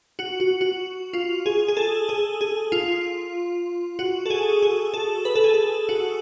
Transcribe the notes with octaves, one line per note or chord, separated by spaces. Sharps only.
F#4
F#4
F#4
F4
G#4
G#4
A4
G#4
G#4
F4
F#4
A4
G#4
G#4
A4
B4
A4
G#4
A4
F#4